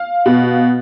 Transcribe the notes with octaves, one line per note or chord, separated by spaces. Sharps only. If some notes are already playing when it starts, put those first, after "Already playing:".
Already playing: F5
B2